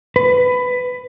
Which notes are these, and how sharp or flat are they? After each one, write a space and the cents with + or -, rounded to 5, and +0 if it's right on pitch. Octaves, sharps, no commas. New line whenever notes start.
B4 +15